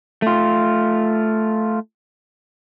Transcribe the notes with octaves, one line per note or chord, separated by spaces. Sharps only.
A3 F4